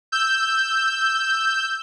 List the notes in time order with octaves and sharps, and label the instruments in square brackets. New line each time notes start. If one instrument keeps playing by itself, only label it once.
[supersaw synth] E6 G6